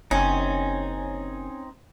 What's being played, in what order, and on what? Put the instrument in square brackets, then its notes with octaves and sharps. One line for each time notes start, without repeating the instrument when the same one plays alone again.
[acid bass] F#1 [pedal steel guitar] C4 D#4 [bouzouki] C#4